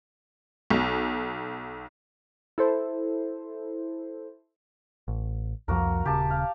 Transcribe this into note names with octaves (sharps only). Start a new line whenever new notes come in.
B1
E4 A4 C5
A1
C2 F2 F3 A#3 F#4 A#4
D#1 C#3 G4 A5
F5